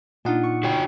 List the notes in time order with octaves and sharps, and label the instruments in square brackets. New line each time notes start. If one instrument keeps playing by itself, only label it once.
[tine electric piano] A#2 F#5 [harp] D4 D#4 F4
[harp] C#6
[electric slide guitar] F#4 C#5 G5